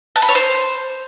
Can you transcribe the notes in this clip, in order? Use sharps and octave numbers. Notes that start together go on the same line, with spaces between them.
A5
B5
C#5
C5